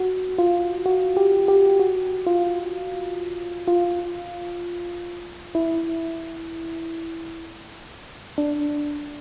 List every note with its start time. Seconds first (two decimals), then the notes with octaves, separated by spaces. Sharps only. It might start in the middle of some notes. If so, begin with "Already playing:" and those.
Already playing: F#4
0.38 F4
0.86 F#4
1.17 G4
1.48 G4
1.80 F#4
2.26 F4
3.68 F4
5.55 E4
8.38 D4